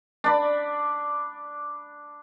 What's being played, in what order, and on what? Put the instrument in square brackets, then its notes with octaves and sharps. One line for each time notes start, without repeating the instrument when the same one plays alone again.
[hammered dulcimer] D4 D5 B5